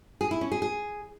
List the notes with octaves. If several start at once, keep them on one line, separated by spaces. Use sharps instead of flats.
G#4
E4
C#4
G#4
G#4